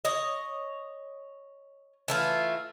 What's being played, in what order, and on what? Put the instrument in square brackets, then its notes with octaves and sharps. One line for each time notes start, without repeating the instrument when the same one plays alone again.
[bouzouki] C#5 D#5
E3 A3 F4